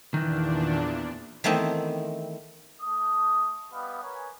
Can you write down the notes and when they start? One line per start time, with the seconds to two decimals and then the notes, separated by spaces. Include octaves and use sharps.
0.14 E2 A#2 D#3 E3 D4
1.44 D#3 E3 A3 B3 C4
2.82 A3 D#6
3.72 G3 B3 B4 D#5 F5
4.03 A#4 B4 C#5 G#5